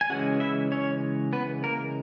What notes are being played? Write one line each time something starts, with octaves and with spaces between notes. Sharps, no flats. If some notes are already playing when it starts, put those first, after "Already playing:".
G#5
C#3 E3 G#3 C#4 F#4 F#5
E4 E5
C#4 C#5
B3 B4
A#3 A#4